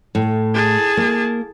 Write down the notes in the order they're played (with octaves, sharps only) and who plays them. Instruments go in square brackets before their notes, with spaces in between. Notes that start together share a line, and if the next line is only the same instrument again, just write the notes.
[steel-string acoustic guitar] A2
[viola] G#4 A5
[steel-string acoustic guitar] A#3